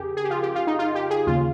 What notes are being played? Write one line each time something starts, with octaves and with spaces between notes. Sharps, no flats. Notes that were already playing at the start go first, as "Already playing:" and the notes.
Already playing: F2 C#3 G4 G#4 A#4
G#4
G4
F4
G4
F4
D#4
F4
G4
G#4
D#2 C#3 F4